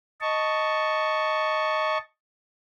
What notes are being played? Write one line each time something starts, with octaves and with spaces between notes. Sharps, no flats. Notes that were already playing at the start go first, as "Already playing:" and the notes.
D#5 A5 C#6